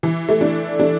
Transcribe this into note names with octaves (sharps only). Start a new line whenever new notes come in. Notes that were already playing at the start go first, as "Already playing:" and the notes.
E3
A3
D4
D4